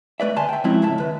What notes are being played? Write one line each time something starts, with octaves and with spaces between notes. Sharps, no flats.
A3 B4 D5 E5
D2 G#5 A5 C6
E5 G5
F3 F#3 G#3 C4 C#4 E4
C#2 A2 E5 A5
D#2 B4